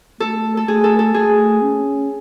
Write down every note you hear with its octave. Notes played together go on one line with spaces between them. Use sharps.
A3 A4
A4
A3 G#4
A4
A4
A3 G#4
C#4